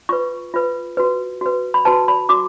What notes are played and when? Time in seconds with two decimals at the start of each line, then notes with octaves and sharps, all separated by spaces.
0.09 F4 B4 C#6
0.54 F4 B4
0.97 F#4 B4
1.41 F#4 B4
1.74 B5
1.85 F#4 B4 A5
2.08 B5
2.29 F#4 D6